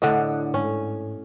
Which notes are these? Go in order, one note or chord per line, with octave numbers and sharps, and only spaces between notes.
A2 D3 D#5 F#5
G#2 C#4